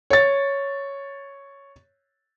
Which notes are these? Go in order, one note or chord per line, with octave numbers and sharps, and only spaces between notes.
C#5 A6